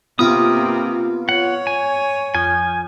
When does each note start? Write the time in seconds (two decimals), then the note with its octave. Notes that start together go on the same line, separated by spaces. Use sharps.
0.19 C3 A#3 B3 F4 D#6
1.29 C#5 F#5
1.67 G#5
2.35 F2 G#5